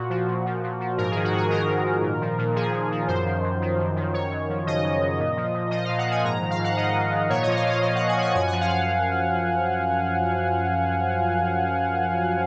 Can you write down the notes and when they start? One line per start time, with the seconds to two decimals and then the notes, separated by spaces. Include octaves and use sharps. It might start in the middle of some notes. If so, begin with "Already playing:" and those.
Already playing: A#2 F#4
0.10 F3
0.27 A#2
0.46 F3
0.63 A#2
0.80 F3
0.98 G#2 A#4
1.11 D#3 G#4
1.24 F#4
1.33 G#2 G#4
1.50 D#3 A#4
1.67 G#2
1.85 D#3
2.02 A#2
2.21 F3
2.38 A#2
2.56 F3 G#4
2.73 A#2
2.91 F3
3.08 F#2 C5
3.25 D#3
3.43 F#2
3.61 D#3
3.78 F#2
3.96 D#3
4.14 F#2 C#5
4.31 F#2
4.49 F3
4.66 C#3 D#5
4.83 F#2
5.01 F#2
5.19 A#2
5.37 F3
5.54 A#2
5.71 F3 D#5
5.85 A#2 F5
5.98 F#5
6.07 F3 G#5
6.24 G#2 A#5
6.41 D#3
6.50 F5
6.59 G#2
6.64 F#5
6.77 D#3 D#5
6.94 G#2
7.11 D#3
7.30 A#2 C#5
7.43 F3 D#5
7.56 F5
7.64 A#2 D#5
7.82 F3 F5
7.95 A#2 F#5
8.08 G#5
8.17 F3 F#5
8.35 F#2 G#5
8.48 F3 F#5
8.61 F5